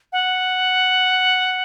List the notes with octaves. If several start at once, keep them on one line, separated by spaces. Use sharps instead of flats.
F#5